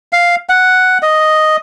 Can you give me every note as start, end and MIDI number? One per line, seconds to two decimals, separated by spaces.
0.13 0.36 77
0.49 0.98 78
1.02 1.56 75